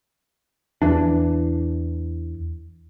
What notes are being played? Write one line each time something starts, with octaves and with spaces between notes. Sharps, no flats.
E2 E3 D4